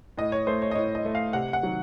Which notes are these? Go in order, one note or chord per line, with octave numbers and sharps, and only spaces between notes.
A2 D#5
C#5
A3 C5
C#5
D#5
A2 C#5
D#5
A3
F5
C3 F#5
F#5
D#3 F#3